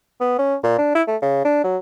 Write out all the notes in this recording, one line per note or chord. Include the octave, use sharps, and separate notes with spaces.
B3
C#4
A#2
D4
E4
A3
C#3
D4
F#3